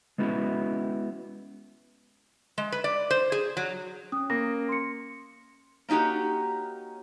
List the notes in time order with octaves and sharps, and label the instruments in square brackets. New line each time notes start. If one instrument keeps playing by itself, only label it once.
[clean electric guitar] G#3 B3 C#4 E4 F#4
[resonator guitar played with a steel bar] G#3
B4
D5
C5
G#4
F#3
[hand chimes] C#4 [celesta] D#6
[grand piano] A#3 [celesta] A#6
[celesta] C6 C#7
[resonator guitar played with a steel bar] A#3 C#4 D#4 F#4 G4